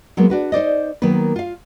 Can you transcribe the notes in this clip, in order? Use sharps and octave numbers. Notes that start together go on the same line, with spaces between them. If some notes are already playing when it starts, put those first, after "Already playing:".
F#3 G#3 A#3 B3
D4 F#4 B4
D#4 C5 D5 D#5
D#3 F#3 A#3 B3 B4
F4 F5